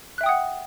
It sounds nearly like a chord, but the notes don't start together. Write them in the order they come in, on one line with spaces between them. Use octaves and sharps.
F#6 E5 G5 D#6 F#5